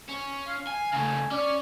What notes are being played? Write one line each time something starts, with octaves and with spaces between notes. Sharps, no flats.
C#4
F5
G#5
C#3 A3 G#5
C#4 D5